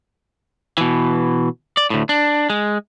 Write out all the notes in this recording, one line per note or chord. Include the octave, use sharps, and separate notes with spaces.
B2 E3
D5
D2 A2
D4
G#3